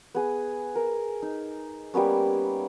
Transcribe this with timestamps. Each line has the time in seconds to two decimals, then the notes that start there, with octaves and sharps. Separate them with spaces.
0.15 B3 G#4
0.76 A#4
1.22 D#4
1.94 G3 A#3 B3 C#4